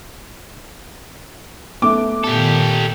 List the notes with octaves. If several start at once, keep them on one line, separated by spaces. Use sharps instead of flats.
A3 B3 D6
A#2 D#3 G4 A4